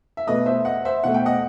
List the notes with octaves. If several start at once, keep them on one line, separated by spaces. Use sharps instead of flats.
E5
B2 A3 B4 D#5
C5 E5
D#5 F#5
C5 E5
B2 A3 F#5
G5
D#5 F#5